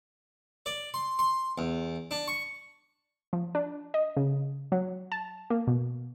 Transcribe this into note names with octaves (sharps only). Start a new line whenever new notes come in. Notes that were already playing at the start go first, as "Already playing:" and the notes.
D5
C6
C6
E2
D4
C#6
F3
D4
D#5
C#3
F#3
A5
A#3
B2